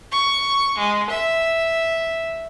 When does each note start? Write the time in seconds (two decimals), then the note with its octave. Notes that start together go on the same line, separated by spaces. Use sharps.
0.12 C#6
0.78 G#3
1.10 E5